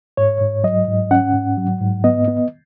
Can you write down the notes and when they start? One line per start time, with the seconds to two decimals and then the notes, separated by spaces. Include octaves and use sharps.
0.17 G#2 C#5
0.41 G#2
0.64 F#3 D#5
0.87 G#2
1.11 C#4 F#5
1.34 G#2
1.58 F#3
1.81 G#2
2.04 B3 D#5
2.28 B3